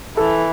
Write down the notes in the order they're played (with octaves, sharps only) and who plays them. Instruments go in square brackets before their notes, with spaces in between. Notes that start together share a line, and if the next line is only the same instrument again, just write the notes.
[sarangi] E3 [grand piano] A4